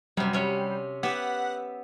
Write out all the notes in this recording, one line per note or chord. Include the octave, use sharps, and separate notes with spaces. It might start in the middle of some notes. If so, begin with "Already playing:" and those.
F#2 C3 G3
C3 C#4
B3 G4 E5 F#5